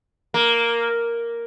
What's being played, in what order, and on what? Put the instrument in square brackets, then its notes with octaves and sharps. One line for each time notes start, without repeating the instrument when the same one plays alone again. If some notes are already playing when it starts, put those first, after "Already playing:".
[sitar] A#3